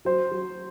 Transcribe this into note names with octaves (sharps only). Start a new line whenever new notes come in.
F#3 C5
F#3